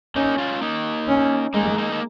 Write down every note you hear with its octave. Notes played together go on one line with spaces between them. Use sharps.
A#3 C#4 D#4
C#4 F4
A#3 D#4
C#4
G#3 A#3 D#4
A#3 D#4
A#3